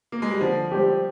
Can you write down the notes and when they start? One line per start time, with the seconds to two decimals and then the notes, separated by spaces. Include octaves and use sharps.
0.12 A#3
0.22 G#3
0.31 G3
0.40 D3 F3
0.72 G3 C4 G4